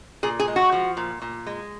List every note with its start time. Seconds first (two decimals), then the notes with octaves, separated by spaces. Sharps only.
0.23 A#2 G#4
0.40 G#4
0.48 G#3
0.56 F#4
0.72 F3
0.97 A#2
1.22 A#2
1.46 G#3